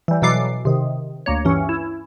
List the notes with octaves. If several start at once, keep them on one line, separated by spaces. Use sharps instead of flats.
E3 G3
B2 E3 F#3 A4 D6 C7
C3 D#3
D2 A#3 C#5
G2 E3 C#4
E4